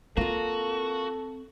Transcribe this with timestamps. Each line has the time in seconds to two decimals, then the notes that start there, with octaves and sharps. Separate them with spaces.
0.17 A#3 C4 F4 F#4 A4